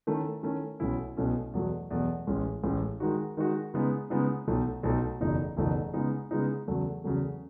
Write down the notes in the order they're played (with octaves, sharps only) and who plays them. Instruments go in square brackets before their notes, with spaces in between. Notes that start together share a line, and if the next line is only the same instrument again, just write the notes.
[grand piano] D#3 A3 C#4 E4
D#3 A3 C#4 E4
B1 B2 A3 C#4 E4
B1 B2 A3 C#4 E4
E2 B2 F#3 A3
E2 B2 F#3 A3
A1 A2 G#3 C#4
A1 A2 G#3 C#4
D#3 G#3 D#4 F#4
D#3 G#3 D#4 F#4
C#3 G#3 B3 D#4
C#3 G#3 B3 D#4
B1 B2 A3 D#4
B1 B2 A3 D#4
F#1 E2 B2 A3 D#4
F#1 E2 B2 A3 D#4
C#3 G#3 B3 D#4
C#3 G#3 B3 D#4
E2 C#3 F#3 A3
E2 C#3 F#3 A3